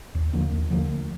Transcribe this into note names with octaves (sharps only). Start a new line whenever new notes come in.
D#2
D3 F3 A#3
D#2
D3 F3 A#3
D2